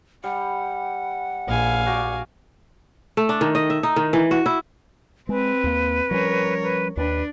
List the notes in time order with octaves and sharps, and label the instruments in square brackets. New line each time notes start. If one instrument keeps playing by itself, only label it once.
[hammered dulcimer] G3 [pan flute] F#5
[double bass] A#1 [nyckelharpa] F5 G#5
[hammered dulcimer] F#4 D5
[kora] A3
D4
D#3
D#5
E5
D#4
D#3
E3
F#4
E4
[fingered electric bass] G#3 [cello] C4 [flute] B4
[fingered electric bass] D#2 A#3
[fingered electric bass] F3 G3 C#4 [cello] A#4 C#5
[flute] B4
[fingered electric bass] D#2 [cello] D4 [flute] B4